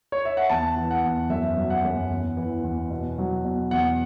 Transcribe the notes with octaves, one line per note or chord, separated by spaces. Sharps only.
C#5
E5
F#5
E2 A5
E3
F#5
E2
F#2 E5
F#3
F#5
F#2
E2
E3
E2
B2
F#3
B2
E2 F#5